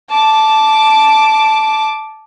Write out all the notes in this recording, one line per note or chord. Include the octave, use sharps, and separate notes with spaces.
A5 D6